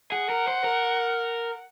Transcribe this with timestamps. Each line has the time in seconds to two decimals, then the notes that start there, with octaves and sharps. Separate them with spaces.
0.11 G#4 F#5
0.29 A#4
0.48 C5
0.64 A#4